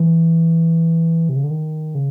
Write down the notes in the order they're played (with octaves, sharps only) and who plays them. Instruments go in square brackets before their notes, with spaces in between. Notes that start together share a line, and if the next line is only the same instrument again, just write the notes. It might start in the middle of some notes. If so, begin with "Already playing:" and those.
Already playing: [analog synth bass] E3
C3
C#3
D3
D#3
C#3